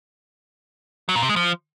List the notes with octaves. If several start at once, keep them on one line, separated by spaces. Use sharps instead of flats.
F#3
A#2
C3
G#3
F3